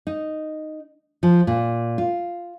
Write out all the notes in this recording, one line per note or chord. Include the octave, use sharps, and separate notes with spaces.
D#4
F3
A#2
F4